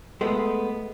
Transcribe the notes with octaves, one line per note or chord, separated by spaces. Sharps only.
G#3 A3 B3